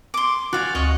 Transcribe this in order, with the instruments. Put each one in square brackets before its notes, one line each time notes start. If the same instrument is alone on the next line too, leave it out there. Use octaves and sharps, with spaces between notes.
[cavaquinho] C6 D6
[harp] F#4 [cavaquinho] D5 F5 G#5
[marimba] D2 [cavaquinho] C#5 D#5 C#6